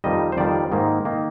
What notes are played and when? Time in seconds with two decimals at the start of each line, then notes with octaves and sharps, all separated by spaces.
0.04 F2 D#3 G3 D#5
0.32 C5
0.37 F2 D#3 G3 D5
0.72 G#2 D#3 A#3
1.05 D#3 A#3